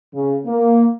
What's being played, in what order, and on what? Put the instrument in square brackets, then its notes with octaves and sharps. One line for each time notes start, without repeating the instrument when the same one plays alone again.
[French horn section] C#3
A#3